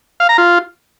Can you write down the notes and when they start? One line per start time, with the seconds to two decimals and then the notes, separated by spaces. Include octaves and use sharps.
0.20 F5
0.29 A#5
0.38 F4